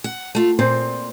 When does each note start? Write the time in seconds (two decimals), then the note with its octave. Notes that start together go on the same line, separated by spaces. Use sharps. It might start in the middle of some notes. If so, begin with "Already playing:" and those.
0.04 F#5
0.35 A3 F4
0.59 A#2 C4 C5